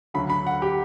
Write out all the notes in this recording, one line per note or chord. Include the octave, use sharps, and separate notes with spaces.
D2 D3 F#3 B5
B5
F#5
G4